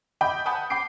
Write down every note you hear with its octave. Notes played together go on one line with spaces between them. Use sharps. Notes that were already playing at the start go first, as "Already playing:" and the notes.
D#5 E5 G5 B5 D6 G6
F#5 G#5 A5 B5 D#6 G6
G5 B5 D6 C7 D7